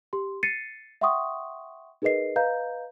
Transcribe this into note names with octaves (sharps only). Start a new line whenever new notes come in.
G4 C6
A6 C7 C#7 D#7
E5 F#5 G5 C6 C#6 D#6
D#4 G#4 A#4 B4 D#5 C7
B4 D#5 F5 A#5 G6